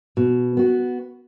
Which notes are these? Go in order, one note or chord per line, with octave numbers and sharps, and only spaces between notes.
B2
B3 F#4